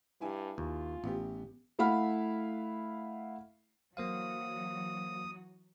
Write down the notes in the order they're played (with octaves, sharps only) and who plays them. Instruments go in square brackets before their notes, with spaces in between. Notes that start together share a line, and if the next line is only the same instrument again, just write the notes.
[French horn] G2 [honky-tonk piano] E4 G#5
[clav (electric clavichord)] D#2 [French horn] F4
[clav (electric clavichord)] A1 [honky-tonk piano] B3 G4
[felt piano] A3 E4 F5 F#5 B5 F6
[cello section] E3 F#3 F#4 [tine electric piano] A#3 C5 F5 [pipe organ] D#6